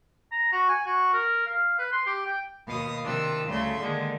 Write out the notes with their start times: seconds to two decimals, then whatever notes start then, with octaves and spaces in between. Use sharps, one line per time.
0.32 A#5
0.52 F#4
0.69 G#5
0.86 F#4
1.13 A#4
1.46 F5
1.79 B4
1.92 C6
2.06 G4
2.26 G5
2.66 D#2 B2 F5 D#6
3.04 C3 D#3 D4 F4 E6
3.48 D2 C#3 G3 A3 E5 C6
3.80 A#2 D3 D#3 G#3